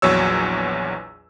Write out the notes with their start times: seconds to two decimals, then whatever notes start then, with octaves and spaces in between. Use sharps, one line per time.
0.02 A#1 E2 F#3 C#5 E6